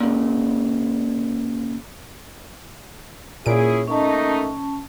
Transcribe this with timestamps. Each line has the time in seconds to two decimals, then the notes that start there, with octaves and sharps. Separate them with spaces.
0.01 A#2 C#3
3.46 A#2 C#4 E4 G#4 D7
3.87 A3 A#3 C#4 D#4 A5